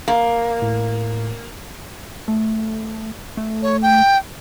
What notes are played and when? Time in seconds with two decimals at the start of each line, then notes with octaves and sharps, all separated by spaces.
0.08 A#3
0.62 A2
2.28 A3
3.37 A3
3.62 C#5
3.82 G5